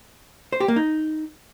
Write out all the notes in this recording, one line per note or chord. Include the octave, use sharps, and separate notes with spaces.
C5
G4
A#3
D#4